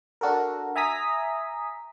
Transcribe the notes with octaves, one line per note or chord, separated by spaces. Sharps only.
D4 F#4 A4 A#4
E5 G#5 A#5 D#6 B6